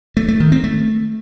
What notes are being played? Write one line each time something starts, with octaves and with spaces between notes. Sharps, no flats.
A3
A3
D#3
C4
A3